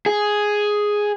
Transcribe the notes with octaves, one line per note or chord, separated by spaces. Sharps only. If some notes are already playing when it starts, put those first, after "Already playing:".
G#4